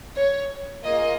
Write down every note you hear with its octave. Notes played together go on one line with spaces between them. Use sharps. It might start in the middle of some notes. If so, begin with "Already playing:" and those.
C#5
A#3 F4 G#4 D#5